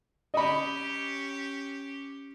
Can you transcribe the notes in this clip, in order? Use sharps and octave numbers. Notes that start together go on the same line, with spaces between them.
C#4 G4 D#5 B5